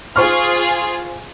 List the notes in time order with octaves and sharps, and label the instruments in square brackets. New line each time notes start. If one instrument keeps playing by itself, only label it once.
[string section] F4 G#4 [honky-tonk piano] C5 C#6 F6